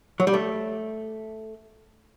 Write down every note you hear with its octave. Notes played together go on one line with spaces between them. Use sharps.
F#3
G3
A3